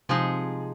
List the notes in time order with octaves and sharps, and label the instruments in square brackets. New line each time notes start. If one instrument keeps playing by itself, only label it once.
[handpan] C3 [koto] F3 G#3 D#4 G#4